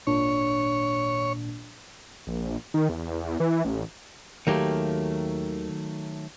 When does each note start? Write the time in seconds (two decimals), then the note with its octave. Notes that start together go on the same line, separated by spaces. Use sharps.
0.07 G#1 A#2 D4 C#5
2.27 A#1
2.74 D#3
2.89 E2
3.40 E3
3.65 A1
4.47 D#2 D#3 F#3 A3 A#3 G4